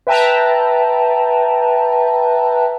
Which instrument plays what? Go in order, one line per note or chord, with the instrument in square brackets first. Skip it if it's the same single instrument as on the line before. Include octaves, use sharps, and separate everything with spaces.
[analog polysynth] B4 E5 G5 A5 A#5